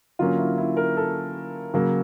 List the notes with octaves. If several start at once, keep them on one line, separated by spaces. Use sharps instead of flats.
D3 F#3 A#3 C#4 F4
E4
E4
A#4
A4
C#3 F#3 A#3